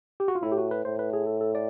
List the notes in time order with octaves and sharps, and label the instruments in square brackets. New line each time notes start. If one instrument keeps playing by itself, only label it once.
[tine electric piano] G4
F#4
F4
[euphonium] A2 [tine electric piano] E4
[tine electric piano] G4
F#4
B4
[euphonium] A2 [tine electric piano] C5
[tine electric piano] B4
G#4
A4
A4
D5